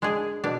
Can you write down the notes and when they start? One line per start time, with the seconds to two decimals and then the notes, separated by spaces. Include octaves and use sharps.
0.02 G#3 D4 G#4
0.44 B2 D4